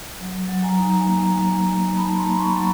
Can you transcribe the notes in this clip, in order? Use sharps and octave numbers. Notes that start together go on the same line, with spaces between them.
F#3
F#3
G#5 A#5
D#4
A#3
F#3
F#3
D#4 A5 B5
A#5 C6
A#3
B5 C#6
F#3